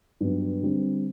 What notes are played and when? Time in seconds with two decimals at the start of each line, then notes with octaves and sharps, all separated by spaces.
0.20 G2 F#3 B3
0.62 D3 G3 C4